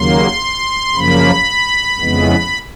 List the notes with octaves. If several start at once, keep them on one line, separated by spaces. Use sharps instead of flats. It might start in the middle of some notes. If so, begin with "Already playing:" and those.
Already playing: D#2 C#3 F#3 A#3 C6
F#2 C#3 F3 A#3 B5
F2 C#3 E3 G#3 B3